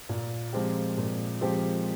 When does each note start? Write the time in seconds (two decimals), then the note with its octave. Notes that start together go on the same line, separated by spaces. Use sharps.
0.09 A#2
0.53 F3 G#3 C4 G4
0.98 A#2
1.41 F3 G#3 C4 G4